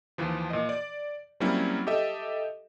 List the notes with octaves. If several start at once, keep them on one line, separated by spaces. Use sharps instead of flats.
D#2 E3 F3
A#2 D#5
D5
F#3 G3 A#3 C4 C#4 E4
G4 A4 D#5 E5